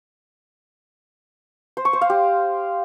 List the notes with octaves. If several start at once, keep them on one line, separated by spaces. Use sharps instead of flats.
C5
C#6
C5
F5
G4